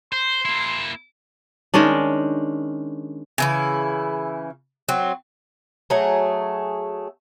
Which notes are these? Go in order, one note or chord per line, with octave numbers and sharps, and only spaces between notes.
C5 C6
A#3 E4
D#3 G#3 C#4 D4
C#3 E3 E4
F#3 C4
F#3 A3 G#4